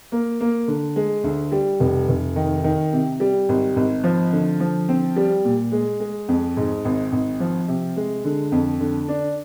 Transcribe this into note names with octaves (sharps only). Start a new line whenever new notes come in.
A#3
A#3
D3
G#3
D2
G3
F1
F1
D#3
D#3
C3
G3
G#1
G#1
F3
D3
F3
C4
G3
A#2
G#3
G#3
F2
G#2
G#1
G#1
F3
C3
G#3
D3
F2
D3
D4